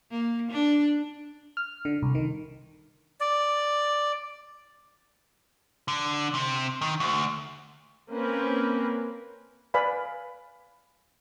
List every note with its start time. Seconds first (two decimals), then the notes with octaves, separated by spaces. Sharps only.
0.11 A#3
0.51 D4
1.57 F6
1.85 D3
2.03 C2
2.15 D#3
3.21 D5
5.88 D3
6.35 C3
6.82 D#3
7.00 D2
8.13 A#3 C4 C#4 A#4 B4
9.74 B4 D5 F5 G#5 B5